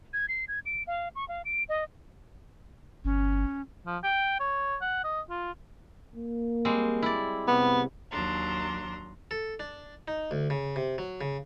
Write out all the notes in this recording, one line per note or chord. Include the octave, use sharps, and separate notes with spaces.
G#6
C7
G#6
D7
F5
C#6
F5
D7
D#5
G1 C#4
F3
G5
C#5
F#5
D#5
F4
A#3
G3 G#3 C4
E4 D5
C3 B3
D#2 F#3 D4 A#5 C6
A4
D4
D#4
D2
C#3
C3
F#3
C#3